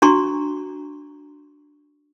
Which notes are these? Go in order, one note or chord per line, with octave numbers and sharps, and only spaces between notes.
D4 F#4 A#5 C6 C#6